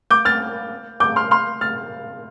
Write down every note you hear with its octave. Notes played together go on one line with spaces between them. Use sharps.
D6 G6
F6 A6
D6 G6
C6 F6
C6 F6
F6 A6